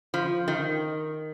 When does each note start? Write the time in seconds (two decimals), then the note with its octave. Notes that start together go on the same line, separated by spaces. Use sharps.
0.14 F3
0.48 D#3